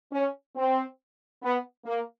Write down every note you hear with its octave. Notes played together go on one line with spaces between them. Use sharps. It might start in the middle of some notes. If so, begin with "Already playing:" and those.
C#4
C4
B3
A#3